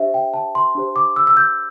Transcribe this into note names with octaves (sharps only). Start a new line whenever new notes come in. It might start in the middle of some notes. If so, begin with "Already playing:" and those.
Already playing: D4 G4 C5 E5
G5
A5
C6
D4 G4 C5
D6
E6
E6
G6